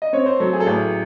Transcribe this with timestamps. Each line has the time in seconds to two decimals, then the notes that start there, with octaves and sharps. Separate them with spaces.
0.02 D#5
0.13 C4 C#5
0.26 C5
0.40 F#3 A4
0.53 G#4
0.60 A4
0.66 A1 G#4